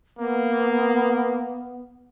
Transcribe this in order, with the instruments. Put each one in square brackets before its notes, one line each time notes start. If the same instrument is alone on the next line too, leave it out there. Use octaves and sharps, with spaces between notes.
[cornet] A#3 [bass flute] B3